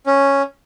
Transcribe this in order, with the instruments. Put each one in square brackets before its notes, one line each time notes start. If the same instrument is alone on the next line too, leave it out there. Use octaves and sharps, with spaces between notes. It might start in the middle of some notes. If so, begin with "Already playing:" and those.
[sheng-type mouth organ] C#4